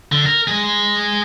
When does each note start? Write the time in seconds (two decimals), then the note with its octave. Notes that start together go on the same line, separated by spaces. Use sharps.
0.12 D3
0.26 A#4
0.48 G#3 G#4